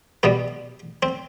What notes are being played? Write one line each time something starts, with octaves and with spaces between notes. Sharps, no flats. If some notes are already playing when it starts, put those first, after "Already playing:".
B2 G3 B3
C4